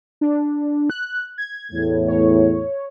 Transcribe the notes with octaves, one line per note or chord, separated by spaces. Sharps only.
D4
F#6
G#6
E2 A2
C#5